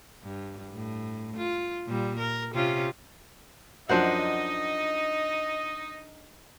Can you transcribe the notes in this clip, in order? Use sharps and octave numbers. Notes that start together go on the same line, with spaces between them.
G2
A2
F4
A#2 G3
A#4
C3 C#4 F4
F#2 F3 D4 D#4 C5 D#5 F#5